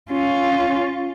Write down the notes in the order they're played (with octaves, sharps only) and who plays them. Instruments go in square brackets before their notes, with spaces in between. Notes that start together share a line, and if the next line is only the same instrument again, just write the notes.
[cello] C#4 F4